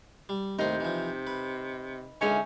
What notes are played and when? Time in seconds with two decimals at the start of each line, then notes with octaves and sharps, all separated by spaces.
0.29 G3
0.59 D#2 A2 C3 C4 D#4
0.80 E3 F3
1.27 B4
2.21 C#2 D3 C#4 D#4 G#4 E5